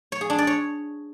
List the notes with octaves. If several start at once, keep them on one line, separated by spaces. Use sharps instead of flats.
C#5
G#4
D4
D5
C#5